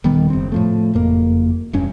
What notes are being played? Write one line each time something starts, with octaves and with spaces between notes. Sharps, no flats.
D#1 D#3 G3 B3
F#1 C4
A2 F3 A3
F#1 F2 A#3
E1 G2 C#4